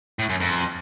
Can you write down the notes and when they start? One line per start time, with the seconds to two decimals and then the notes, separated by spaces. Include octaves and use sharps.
0.19 A2
0.30 F#2
0.40 F2